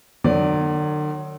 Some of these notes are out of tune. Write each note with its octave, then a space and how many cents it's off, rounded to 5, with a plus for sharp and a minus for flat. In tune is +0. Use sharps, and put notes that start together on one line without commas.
D3 +45 F#3 -5 D5 +0